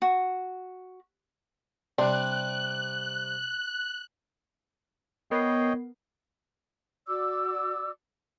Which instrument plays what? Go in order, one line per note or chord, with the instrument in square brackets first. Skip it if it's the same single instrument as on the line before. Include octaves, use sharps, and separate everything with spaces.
[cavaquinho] F#4
[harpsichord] C3 G3 [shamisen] C4 D4 [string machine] F#6
[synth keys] B3 A#4 C7 [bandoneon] C#5 D#5 G5
[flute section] F#4 D5 D6 E6